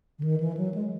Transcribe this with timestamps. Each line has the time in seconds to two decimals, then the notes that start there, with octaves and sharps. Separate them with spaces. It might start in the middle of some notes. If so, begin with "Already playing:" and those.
0.19 D3
0.23 D#3
0.40 E3
0.57 F#3
0.74 G#3